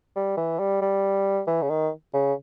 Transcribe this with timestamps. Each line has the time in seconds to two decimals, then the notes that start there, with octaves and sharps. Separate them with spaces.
0.16 G3
0.37 E3
0.59 G3
0.81 G3
1.47 E3
1.62 C#3
1.70 D#3
2.13 C#3